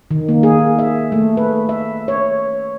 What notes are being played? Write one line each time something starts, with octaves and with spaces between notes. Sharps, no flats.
D#3
A#3
G#4
E5
A3
B4
E5
C#5